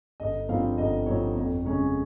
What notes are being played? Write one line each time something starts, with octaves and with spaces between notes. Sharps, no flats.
G1 D#5
G2 F3 C4 D#4 F5
G1 D#5
G2 F3 C4 D#4 C#5
F2
C#3 G#3 C#4